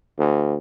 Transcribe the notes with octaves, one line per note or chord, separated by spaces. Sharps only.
D2